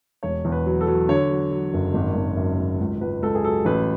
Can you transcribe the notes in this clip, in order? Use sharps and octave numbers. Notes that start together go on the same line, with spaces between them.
E1 C#5
E2
B4
F#3
A4
F#3
D3 C#5
F#3
F#3
F#1
G#1
G#1
F#2
G#1
C#2
C#2 B4
C#2 A4
G#4
F#3 A4
A1 B4